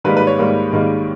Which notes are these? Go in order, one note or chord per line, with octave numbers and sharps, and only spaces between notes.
G#2 D#3 G3 A#3 B4
B4
C#5
G#2 D#3 G3 A#3
G#2 D#3 G3 A#3